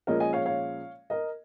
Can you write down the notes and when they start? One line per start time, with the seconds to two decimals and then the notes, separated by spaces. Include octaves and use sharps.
0.07 A#2 F3 G#3 C#4 A#4 D#5
0.20 D#5 G#5
0.33 C#5 F5
0.46 C#5 F5
1.10 A#4 D#5